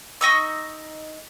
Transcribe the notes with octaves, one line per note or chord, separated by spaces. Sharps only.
D#4 D#5 C#6 E6